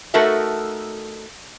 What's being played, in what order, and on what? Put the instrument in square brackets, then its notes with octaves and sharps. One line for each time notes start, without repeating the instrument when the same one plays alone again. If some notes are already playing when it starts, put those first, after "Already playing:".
[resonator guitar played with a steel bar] A3 D#4 F#4 A4 A#4 E5